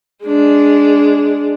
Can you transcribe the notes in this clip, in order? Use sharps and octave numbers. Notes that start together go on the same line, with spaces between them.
G#3 D4